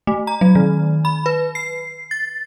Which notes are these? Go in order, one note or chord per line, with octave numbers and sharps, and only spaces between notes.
A3
A#5
F#3
D#3
B5
B4
C7
A6